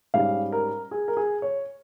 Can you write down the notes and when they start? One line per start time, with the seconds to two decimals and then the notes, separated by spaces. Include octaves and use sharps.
0.14 G#2 G3 C#4 F5
0.52 A#4
0.91 G#4
1.08 A#4
1.17 G#4
1.42 C#5